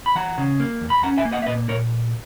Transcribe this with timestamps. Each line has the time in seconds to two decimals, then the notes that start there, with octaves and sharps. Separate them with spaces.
0.06 B5
0.15 E3 F#5 A#5
0.38 C#3
0.60 A#3
0.81 E2
0.90 B5
1.03 C#4 F#5 A#5
1.17 E5 G#5
1.25 A#3
1.32 D#5 F#5
1.42 E5
1.46 A#2 B4 D#5
1.69 A#2 A#4 C#5